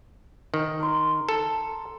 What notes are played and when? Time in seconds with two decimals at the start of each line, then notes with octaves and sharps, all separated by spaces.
0.54 D#3
0.80 A#4 C6
1.29 A4